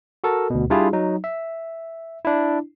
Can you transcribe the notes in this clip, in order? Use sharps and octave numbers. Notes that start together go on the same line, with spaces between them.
F#4 A4 A#4 A5
D2 B2
G3 D4 E4 F4 G4 G#4
F#3 D#4
E5
D4 E4